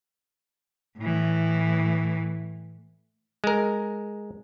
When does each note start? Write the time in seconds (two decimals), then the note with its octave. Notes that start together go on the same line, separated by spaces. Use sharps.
0.98 A2 E3
3.44 G#3 A#4